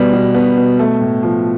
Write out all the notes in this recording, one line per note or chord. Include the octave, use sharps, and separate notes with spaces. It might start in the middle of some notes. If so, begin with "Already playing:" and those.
Already playing: B2 G3 B3
B2
B3
B2
A3
A2
F3